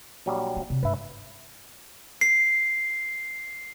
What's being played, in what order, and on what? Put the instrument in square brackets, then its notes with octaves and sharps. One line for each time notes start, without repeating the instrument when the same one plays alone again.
[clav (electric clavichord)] A#1 F#3 G3
[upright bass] A#3
C3
[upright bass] G2 G#3 [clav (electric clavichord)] B4 E5
[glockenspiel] C7